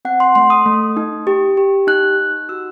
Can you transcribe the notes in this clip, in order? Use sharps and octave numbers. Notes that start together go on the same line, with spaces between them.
C4 F#5
C6
A3 C6
D#6
A3
D#4
G4
G4
D#4 F#6
D#4
F#4 E6